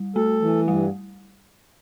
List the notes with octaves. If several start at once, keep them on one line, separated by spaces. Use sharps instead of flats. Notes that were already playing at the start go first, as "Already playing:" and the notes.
Already playing: G3
A3 A4
E3
G2 G3